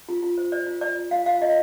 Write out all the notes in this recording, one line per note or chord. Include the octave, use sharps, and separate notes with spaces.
F4
F4
C5
C5 D5
F4
F4 D5
F4
F4 F5
F4 F5
F4 D#5